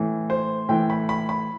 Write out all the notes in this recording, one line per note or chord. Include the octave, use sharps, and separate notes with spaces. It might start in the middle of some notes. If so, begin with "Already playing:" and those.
Already playing: A2 E3
C5
A2 E3 G5
B5
B5
B5